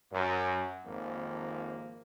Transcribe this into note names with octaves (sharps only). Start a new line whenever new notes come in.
F#2
G#1 F2 D#3 F3 A#3